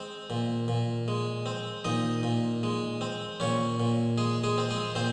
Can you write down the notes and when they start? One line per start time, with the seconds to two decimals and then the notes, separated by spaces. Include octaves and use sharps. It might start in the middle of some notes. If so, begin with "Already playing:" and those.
Already playing: G#3 C4
0.30 A#2
0.68 A#2
1.08 G#3
1.46 C4
1.85 A#2 D#4 D#5
2.23 A#2
2.63 G#3
3.01 C4
3.40 A#2 C#4 C#5
3.80 A#2
4.18 G#3 G#4
4.44 G#3 G#4
4.58 C4
4.71 G#3 G#4
4.95 A#2 C4 C5